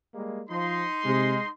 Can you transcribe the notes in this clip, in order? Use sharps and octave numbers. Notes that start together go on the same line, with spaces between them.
G3 G#3 A#3
F3 D#4 C6
C3 G#3